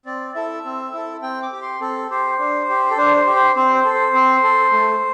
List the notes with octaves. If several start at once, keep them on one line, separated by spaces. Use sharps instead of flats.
C4 D5
E4 A4 E5
C4
E4 A4
C4 G5
D6
G4
C6
C4 A4
G4 C5
D4
G4
A4
D4 C5
C5
G4
C5
C4 C5
C5
A4
C5
C4
A4
A3